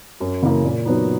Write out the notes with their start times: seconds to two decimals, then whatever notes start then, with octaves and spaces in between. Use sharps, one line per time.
0.20 F#2
0.43 C#3 E3 A#3
0.64 A#2
0.85 F#3 B3 D#4